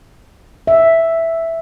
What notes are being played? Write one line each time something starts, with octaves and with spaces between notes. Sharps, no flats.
E5